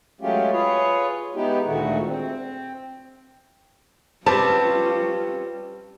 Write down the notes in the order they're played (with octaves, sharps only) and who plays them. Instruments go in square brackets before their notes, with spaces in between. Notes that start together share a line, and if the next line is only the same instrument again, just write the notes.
[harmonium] F#3 G#3 A3 C#4 F4 G4
F4 G#4 B4 C#5
G#3 B3 D#4 E4 G4
D2 A#2 D#3 G#3 A3 F#4
C4
[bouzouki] G3 C4 [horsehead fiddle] C#4 F4 [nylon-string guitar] B4 [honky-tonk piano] A5